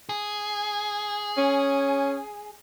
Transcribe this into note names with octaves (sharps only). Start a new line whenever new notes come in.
G#4
C#4